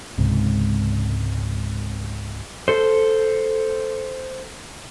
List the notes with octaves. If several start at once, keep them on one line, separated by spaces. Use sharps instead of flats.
C#2 G#2 C3
A4 C5